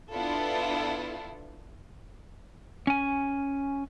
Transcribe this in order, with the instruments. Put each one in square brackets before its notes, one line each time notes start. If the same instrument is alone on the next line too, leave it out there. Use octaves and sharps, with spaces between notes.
[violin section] B3 D4 E4 F4 A4
[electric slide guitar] C#4 G#5